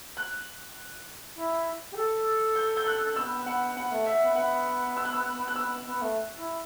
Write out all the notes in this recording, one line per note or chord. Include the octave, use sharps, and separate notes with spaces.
F#6
E4
G4
A4
G6
G6
F#6
B3 E6
B3 F#5
B3 F#5
A3
E5
B3
B3 F#5
E6
F#6
E6
F#6
B3 E6
B3
A3
E4